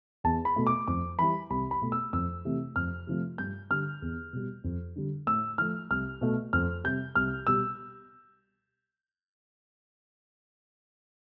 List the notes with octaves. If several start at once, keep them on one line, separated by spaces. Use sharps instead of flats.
E2 A5
B5
B2 A3
D6
F2 D6
E3 G3 B5
C2 B5
B5
B2 A3
E6
F2 E6
C3 E3 A3
F2 F6
C3 F3 A3
G2 G6
D3 G3 F6
E2
B2 G3
F2
D3 G3
A2 E6
F3 A3 F6
C2 F6
B2 A3
F2 F6
C3 G3 G6
C2 F6
B2 G3 E6